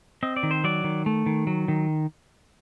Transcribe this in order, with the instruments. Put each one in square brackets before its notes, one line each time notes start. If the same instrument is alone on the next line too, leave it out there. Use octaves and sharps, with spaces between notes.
[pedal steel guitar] C4 D#5
D5
D#3
C5
F#3 D5
D#3
A3
D#3
F#3
D#3